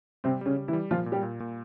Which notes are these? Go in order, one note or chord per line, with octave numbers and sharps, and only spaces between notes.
C3 G3 C4
C#3 G3 C#4
G3
E3 E4
G3
A#2 F3 F4
A#2
G3 G4
A#2
A#2